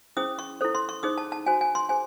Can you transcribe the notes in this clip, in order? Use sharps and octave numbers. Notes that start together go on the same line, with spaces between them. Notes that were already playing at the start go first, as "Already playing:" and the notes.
C#4 E4 G#4 C5 D#6
C#6
E4 A4 C5
C6
C#6
D#4 G#4 C5 D#6
A5
A5
F#4 C5 G#5
G#5
C6
G#4 C5 G#5